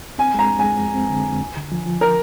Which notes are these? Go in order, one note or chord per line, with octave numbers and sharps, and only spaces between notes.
C4 G#5
G#3 A#5
F2
G#3 G#5
F2
C4
D3
F2
D2
D3
F3
F3
A#4